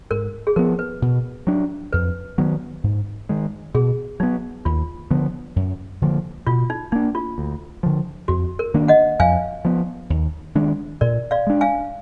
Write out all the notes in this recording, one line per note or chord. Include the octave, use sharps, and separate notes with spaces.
G#2 A#4
G#4
F3 B3 A#4
B4
B2
F#3 D4
F2 B4
D#3 F#3 B3
G#2
D#3 G#3
B2 G#4
F#3 B3 D#4
D#2 F4
D3 F3 B3
F#2
D3 F3 A#3
B2 F4
D#4
A#3 D4 D#4
F4
D2
D3 F3
F2 F#4
A#4
D#3 A#3 D4
D#5 F#5
F2 F5 G#5
F3 B3
D#2
D#3 G#3 D4
A#2 A#4 D5
D5 F5
G#3 D4
F5 G#5